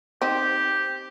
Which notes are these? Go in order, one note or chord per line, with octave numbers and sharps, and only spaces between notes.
C4 D#4 G4